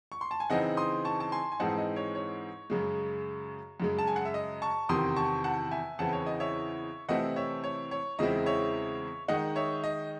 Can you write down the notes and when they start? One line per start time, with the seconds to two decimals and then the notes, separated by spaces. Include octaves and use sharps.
0.12 C#6
0.21 C6
0.31 A5
0.40 G#5
0.50 C#3 E3 C4 D#4 D#5 F#5
0.77 C6 D#6
1.05 A5 C#6
1.20 A5
1.32 G#5 C6
1.52 G#5
1.60 G#2 E3 G#3 C4 D#4 F#5 A5
1.78 D#5
1.96 C#5
2.15 C#5
2.70 F#2 C#3 G#3
3.80 F#2 C#3 G#3
3.99 A5
4.07 G#5
4.16 F#5
4.25 E5
4.34 D#5
4.62 A5 C#6
4.89 E2 C3 D#3 C6 D#6
5.16 A5 C#6
5.44 F#5 A5
5.71 E5 G#5
5.99 E2 C#3 E3 C4 F#5 A5
6.13 C#5
6.26 D#5
6.40 C#5 E5
7.09 C3 E3 A3 C4 E4 D#5 F#5
7.36 C#5 E5
7.64 C#5
7.91 C#5
8.19 E2 C#3 G#3 C4 E4 D#5
8.46 C#5 E5
9.28 D#3 G#3 D#4 D#5 F#5
9.56 C#5 E5
9.84 D#5